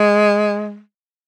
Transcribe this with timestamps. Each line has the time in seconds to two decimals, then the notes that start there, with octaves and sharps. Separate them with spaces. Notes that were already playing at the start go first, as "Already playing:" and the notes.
Already playing: G#3